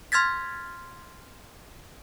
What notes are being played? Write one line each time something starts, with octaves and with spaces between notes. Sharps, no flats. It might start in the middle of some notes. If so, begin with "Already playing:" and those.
C6 F6 G#6 A6 B6